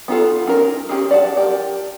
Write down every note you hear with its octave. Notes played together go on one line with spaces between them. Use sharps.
B3 D#4 F4 A4
C#4 D#4 A#4
C#4 G4 G#4
D5 F#5 A5
G4 A#4